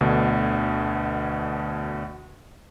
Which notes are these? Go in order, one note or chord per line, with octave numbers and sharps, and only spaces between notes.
D2 B2 D3